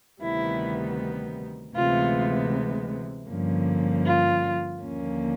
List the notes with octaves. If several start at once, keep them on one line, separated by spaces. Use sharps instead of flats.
D2 C3 D#3 G3 B3 E4
D2 C3 E3 G#3 B3 F4
G2 D3 F3 A#3 C#4
F4
D#2 D3 F3 A#3 C#4